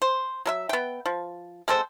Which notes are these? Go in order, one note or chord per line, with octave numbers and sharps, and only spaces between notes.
C5
F#3 A#4 E5
B3 G5
F3
G#3 C4 A4 C5